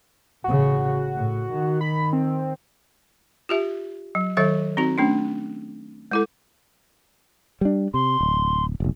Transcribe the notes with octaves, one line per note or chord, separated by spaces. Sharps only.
A1 C#3 F#4
A2
D#3
B5
C4
F4 G4 E5
F#3
D#3 F#3 A4 E5
C4 D#4 F#4
A3 C#4 D4
G#3 E4 A4
G3 D4
C3 C6
D1
F1 B1